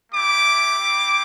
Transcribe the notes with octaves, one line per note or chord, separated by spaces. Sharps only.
A3 E4 G4 D6
C4 E4 G4